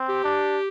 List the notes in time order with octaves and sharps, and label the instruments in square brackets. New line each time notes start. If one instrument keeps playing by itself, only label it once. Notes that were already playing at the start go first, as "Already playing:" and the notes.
Already playing: [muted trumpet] C4
[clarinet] G4
[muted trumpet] D4